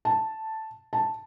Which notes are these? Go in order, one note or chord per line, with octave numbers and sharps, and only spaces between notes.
A5
A5